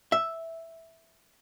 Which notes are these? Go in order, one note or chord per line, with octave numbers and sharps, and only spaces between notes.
E5